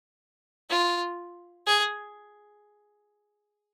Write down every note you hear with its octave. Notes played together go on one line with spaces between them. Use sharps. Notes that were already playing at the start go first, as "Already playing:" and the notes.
F4
G#4